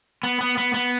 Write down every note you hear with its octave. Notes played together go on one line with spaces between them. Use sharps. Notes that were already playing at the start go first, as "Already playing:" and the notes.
B3
B3
B3
B3